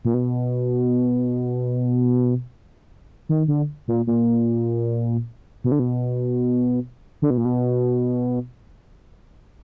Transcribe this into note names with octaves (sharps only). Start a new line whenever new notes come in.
A#2
B2
D#3
D3
A#2
A#2
B2
D3
B2
D3
B2
A#2
B2